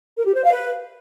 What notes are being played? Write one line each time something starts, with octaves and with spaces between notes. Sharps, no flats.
A#4
G4
C5
F5
B4